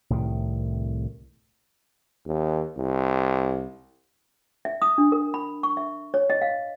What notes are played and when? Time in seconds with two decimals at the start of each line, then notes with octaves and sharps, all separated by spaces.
0.10 C2 A2 C3 D#3
2.26 D#2
2.77 C2
4.65 E5
4.82 D#6
4.98 D4
5.12 A#4
5.34 B5
5.63 C#6
5.77 E5
6.14 C#5
6.30 D#5
6.42 F5